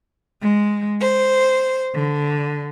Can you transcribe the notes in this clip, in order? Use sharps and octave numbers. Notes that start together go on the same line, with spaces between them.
G#3
C5
D3